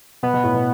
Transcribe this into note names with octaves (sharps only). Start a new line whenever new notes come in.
B2 B3
B2
A2
B2